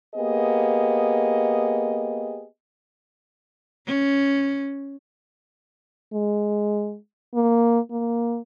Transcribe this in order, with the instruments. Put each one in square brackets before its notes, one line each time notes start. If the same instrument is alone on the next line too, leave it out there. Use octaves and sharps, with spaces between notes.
[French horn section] A#3 B3 G4 G#4 D#5
[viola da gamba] C#4
[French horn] G#3
A#3
A#3